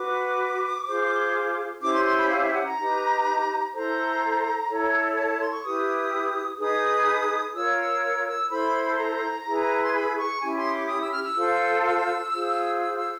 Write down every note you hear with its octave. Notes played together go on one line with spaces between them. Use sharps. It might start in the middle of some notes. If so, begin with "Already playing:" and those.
Already playing: F#4 B4 D6
F4 G#4 C5
C#4 E4 G4 C5 D6
C6
C6
B5
F5
E5
F#5
A#5
D#4 G4 B4
E4 A4 C5 A#5
E4 A4 C#5
A5
A5
C6
C#6
E4 G4 B4 D#6
D#4 G#4 B4 D#6
F4 A#4 C#5 E6
E6
E6
E6
E4 A4 C5 B5
A#5
E4 G#4 B4
C6
B5
C#6
C#4 E4 G4 G#5
C6
D#6
D6
D#6
E6
F6
E6
F4 A4 C5
E6
F4 G#4 C5
E6
E6